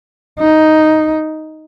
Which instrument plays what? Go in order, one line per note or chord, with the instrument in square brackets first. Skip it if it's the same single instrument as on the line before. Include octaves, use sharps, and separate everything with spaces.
[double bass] D#4